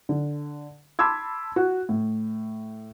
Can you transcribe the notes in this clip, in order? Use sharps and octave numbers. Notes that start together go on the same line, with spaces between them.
D3
A5 B5 C6 D6 E6 G#6
F#4
A2